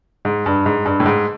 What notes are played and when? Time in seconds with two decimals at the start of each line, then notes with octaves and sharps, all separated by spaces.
0.25 G#2
0.46 G2
0.66 G#2
0.86 G2
1.00 A2
1.06 G#2